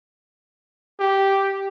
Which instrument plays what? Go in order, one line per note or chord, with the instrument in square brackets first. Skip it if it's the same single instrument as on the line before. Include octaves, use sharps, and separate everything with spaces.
[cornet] G4